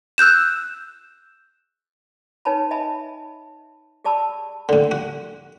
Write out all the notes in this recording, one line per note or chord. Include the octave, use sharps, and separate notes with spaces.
E6 F#6 G6 E7
D#4 B4 C#5 G#5 A5 B5
D#5 E5 G#5 A5 B5
G4 G#4 D5 A5 B5 E6
A2 D3
F#4